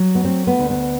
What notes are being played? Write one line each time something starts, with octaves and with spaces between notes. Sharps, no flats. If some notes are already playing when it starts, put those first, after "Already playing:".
Already playing: F#3
B3
A3 C4
B3
D2
B3